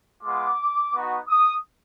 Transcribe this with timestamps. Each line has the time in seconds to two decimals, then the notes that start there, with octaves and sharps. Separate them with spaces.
0.23 G#3 B3 F4 D6
0.94 B3 D#4 F#4
1.28 D#6